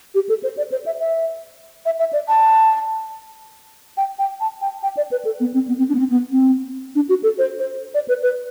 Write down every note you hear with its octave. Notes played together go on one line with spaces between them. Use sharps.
G4
A4
C5
D5
C5
E5
E5
E5
E5
D5
A5
G5
G5
A5
G5
G5
D5
B4
A4
B3
C4
B3
C4
D4
B3
C4
B3
C4
D4
F#4
A4
C5
C5
D5
B4
B4